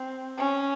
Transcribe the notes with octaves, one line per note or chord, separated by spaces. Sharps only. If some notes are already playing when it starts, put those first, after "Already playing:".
Already playing: C4
C#4